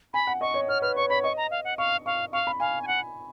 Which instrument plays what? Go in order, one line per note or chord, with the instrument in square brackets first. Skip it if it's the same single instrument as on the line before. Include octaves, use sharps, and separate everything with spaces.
[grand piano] G#5 [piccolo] B5
[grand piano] F#5
[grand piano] D#5 [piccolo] C#6
[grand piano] C#5
[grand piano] C#5 [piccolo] F6
[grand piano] B4 [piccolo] F6
[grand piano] C#5 [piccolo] C#6
[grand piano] C#5 [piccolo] B5
[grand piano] D#5 [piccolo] C#6
[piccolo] A#5
F5
F#5
[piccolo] F5 [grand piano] C#6
[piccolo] F5 [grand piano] C#6
[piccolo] F5 [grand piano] C#6
[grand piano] B5
[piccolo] F5 [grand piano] G#5
[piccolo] G#5
F#5